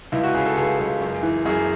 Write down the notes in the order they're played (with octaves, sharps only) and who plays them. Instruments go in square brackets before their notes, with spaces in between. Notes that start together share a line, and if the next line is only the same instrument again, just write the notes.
[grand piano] C#2 E4
F#4
C#3 G#4
A4
C#2 G#4
C#2
F#2
E3
F#2 G#4